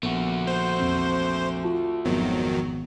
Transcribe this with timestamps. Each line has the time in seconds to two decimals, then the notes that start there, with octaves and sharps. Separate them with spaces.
0.03 A#1 A3 B3 F#4
0.47 C5
0.80 E2 C4
1.63 F4 A5
2.05 G#1 F2 D#3 F#3 B3